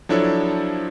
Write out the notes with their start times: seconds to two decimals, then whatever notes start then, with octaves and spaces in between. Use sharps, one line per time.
0.09 F3 F#3 D4 E4 A4 C#5